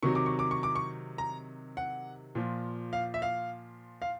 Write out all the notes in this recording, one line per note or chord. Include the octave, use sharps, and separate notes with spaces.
C3 D#3 F#3 C#6
D6
C#6
D6
C#6
D6
C#6
A#5
F#5
A#2 F3
F5
E5
F5
F5